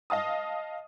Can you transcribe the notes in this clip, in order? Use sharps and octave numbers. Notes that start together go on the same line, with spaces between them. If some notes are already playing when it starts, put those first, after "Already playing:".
D#5 F5 A5 D#6